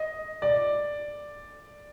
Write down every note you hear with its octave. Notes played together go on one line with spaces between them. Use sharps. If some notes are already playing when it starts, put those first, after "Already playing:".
Already playing: D#5
D5